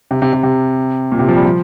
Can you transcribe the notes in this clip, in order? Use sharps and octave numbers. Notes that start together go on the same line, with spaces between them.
C3
C3
C3
C3
A#2
C3
F3
G3
F3